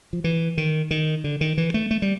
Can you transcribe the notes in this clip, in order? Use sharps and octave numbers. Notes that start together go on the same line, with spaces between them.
F3
E3
D#3
D#3
D3
D#3
E3
A3
A3
G3